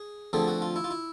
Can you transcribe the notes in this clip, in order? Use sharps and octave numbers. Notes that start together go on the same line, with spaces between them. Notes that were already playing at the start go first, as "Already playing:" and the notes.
Already playing: G#4
D3 F3 A3 C4 G#4
F#4
F4
E4
F4
E4